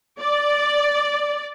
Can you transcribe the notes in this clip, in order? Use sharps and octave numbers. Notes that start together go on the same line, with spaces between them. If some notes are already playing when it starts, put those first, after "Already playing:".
D5